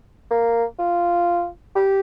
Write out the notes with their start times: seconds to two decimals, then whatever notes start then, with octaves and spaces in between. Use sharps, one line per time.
0.30 A#3
0.79 F4
1.75 G4